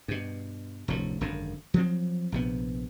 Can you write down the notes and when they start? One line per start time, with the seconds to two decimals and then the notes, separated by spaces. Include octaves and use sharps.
0.08 G2 B2
0.88 F1 D2 A2
1.21 G#1 F#2 D3
1.74 F3 F#3 C4
2.32 A#1 C3 B3